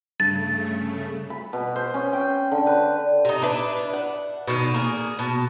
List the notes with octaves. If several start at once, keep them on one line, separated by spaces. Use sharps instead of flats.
G2 C#3 A3 A6
B5
B2
C5
C#4
G5
D3
B4
C3 D#4
D4 E4 B4
F#5
B2 D3 D#3
A#3 G#4
B2 A5